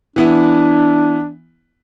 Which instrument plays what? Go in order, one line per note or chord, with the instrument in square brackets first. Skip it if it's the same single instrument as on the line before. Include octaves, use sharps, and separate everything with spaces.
[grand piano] E3 B3 E4 [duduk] D4